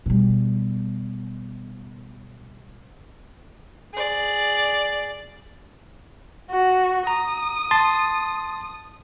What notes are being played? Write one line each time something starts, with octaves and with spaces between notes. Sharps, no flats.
B2 G3
G#4 D5
F#4
A#5 D#6
A5 C6 A6